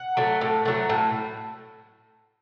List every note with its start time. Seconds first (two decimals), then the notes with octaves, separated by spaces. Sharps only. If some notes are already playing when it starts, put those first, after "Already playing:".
Already playing: F#5
0.17 F#3 A3
0.41 A2
0.65 F#3 A3
0.89 A2